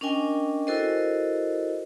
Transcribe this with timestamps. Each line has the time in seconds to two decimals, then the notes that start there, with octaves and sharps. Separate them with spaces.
0.01 C#4 D4 A#4 D#5 G5 G#5
0.67 E4 F#4 A4 A#4 C5 D#5